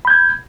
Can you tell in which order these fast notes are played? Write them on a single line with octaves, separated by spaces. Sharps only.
B5 G6 G#6